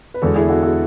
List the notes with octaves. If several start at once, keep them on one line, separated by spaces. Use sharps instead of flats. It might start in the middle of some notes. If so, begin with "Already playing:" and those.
B4
E2 D3 G#3 F#4 A4
E4 G#4
F#4 A4
F#4 A4